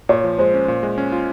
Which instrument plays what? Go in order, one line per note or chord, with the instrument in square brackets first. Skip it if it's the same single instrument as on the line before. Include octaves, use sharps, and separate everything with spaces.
[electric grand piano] A#2 [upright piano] C#5
[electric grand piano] F3
[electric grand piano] G#3 [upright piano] C5
[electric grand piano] C#4
A#2
G#3
C#4
F4